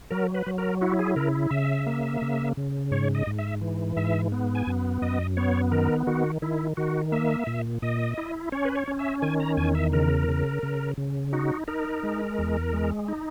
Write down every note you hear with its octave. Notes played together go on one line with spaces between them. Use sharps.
F#3 A#4
B4
F#3
A#4
E4 F#4
G#4
C#3 A#4
C#3 E5
A#3
C#3
C#3
G#2 C#5
D#5
G#2
E5
E3
G#2 E5
B3
G#5
F#2
F#2 D#5
B3 C#5
D#3 A#4
D#3 F#4
D#3 E4
D#3 F#4
A#3 E5
A#2
A#2 D#5
E4
C#4 C#5
B4
C#5
C#4
E5
D#3 G#5
A#5
E2 G#5
E5
C#3 A#4
C#3
C#3
C#3
D#4 F#4
D#4 A#4
G#3
E2
G#3
D#4